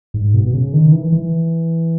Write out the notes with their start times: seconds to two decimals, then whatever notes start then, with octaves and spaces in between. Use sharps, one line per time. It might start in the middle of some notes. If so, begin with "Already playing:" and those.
0.14 G#2
0.34 B2
0.46 B2
0.54 C#3
0.73 D#3
0.92 E3
1.12 E3